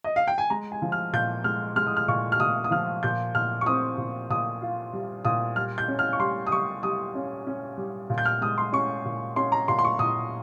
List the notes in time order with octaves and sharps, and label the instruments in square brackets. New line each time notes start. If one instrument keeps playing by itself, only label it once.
[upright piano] D#5
F5
G5
G#5
G#3 A#5
G#5
F3
F6
A#2 G6
G#3 F6
G#3 F6
D#6
F6
A#2 C#6
F6
A#2 D#6
D#6
F3 F6
A#2 G6
A#2 F6
C#6
C4 D#6
A#2
A#2 D#6
F4
G3
A#2 D#6
G3 F6
G6
C#4
F6
C#6
G3 C6
D#6
G3 C#6
G3 D#6
C#4
C#4
G3
A#2
G6
F6
G#3 D#6
C6
C#4 C#6
A#2
C#4 C6
A#5
A#2 C6
C6
C#6
A#2 D#6